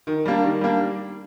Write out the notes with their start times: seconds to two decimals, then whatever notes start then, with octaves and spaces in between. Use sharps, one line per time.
0.07 D#3
0.26 G3 A#3 D4
0.43 D#3
0.61 G3 A#3 D4